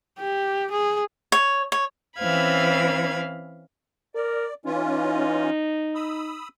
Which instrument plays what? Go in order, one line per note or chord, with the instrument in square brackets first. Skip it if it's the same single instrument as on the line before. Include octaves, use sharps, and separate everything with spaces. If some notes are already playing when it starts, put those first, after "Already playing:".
[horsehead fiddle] G4
G#4
[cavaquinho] C#5
C#5
[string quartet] E3 C4 C#4 F5 B5 G#6
[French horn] A#4 [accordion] D5
[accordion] E3 C#4 F4 [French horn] D#4
[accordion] B5 D#6 E6